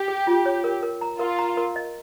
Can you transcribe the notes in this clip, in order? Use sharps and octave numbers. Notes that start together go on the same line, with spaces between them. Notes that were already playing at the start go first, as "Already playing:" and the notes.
Already playing: G4
G#4
F4
C#5
A#4
A#4
A#5
F4 A#4
A#5
A#4
D#5